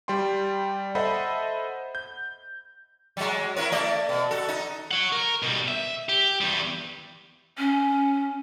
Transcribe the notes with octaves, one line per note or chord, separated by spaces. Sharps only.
G3 D5 G5 C6
A4 C5 D#5 E5 F#5 B5
G6
F#3 G#3
E4 A#4 C#5
A3 D5
B2
F#4 A4
D#4
C#5 F#5
A#4
B2 G3
E5
G4
E2 G3
C#4